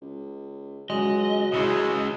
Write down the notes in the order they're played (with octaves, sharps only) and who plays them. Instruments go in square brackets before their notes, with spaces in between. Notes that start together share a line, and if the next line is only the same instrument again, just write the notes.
[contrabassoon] C#2
[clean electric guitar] C#2 G#2 G#3 [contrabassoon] F#3 [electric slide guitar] D#5
[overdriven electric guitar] C#3 G#3 [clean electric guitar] E4 F#4 C5